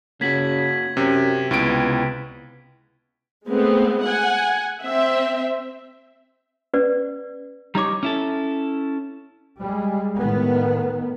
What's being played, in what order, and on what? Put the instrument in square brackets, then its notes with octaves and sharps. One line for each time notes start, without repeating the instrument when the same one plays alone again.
[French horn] C#3 [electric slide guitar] A#3 F#4 [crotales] G#6 B6 F#7
[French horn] F#2 [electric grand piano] C3 [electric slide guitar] C#4
[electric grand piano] C#2 D7 [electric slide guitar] C3 E4 G5 [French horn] B3
[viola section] G#3 A3 B3 C4
F#5 G#5
C4 E5
[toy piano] C#4 B4 D5
[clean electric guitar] G3 D#4 C#5 [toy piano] A#5 D6
[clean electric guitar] C#4 E4 A4
[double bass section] G3 G#3
A2 D#3 B3